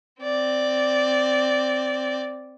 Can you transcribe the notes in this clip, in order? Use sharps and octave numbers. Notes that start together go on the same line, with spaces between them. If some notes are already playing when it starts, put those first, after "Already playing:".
C4 D5